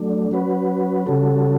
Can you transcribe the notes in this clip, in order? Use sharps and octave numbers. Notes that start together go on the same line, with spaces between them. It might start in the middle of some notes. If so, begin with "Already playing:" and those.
Already playing: F#3 A3 D4
F#3 C#4 F#4 B4
C#3 G3 C#4 F#4 A4